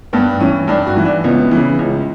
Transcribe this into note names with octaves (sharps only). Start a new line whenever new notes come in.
G2 B3
E3 C#4
G2 D4
F#4
E3
D4
C#2 B3
C#3 E3
C#2